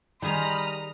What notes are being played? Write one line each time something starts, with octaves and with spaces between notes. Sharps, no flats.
D#3 G3 G#4 C5 A#5 B5 D#6 F6